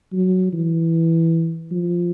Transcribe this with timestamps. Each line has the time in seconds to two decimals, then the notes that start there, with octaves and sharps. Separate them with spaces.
0.13 F#3
0.53 E3
1.72 F3